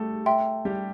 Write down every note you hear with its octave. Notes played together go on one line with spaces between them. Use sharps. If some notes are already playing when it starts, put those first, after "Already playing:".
Already playing: G3 A3 G4 A4
E5 G5 C6
G3 G4